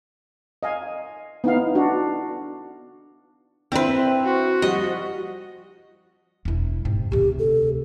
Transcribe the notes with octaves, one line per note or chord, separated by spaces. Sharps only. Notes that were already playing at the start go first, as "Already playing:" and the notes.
D#5 F5 G#5
B3 D#4 E4 F5
D4 F#4
C4 D4 E4 B4 C5
F#4
F3 G3 D#5
E1 E4
G#2 C3
D2 C3 G4
A4